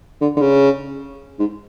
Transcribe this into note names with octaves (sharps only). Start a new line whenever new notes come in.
D3
D3
C#3
G#2